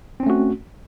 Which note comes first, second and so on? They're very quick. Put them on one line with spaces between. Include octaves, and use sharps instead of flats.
C4 C#4 A3 F#4